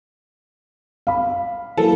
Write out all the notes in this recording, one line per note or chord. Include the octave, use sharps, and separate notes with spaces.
F5 B5
E3 F#3 A#3 A4